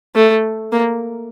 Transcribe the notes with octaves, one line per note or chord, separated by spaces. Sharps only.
A3
A#3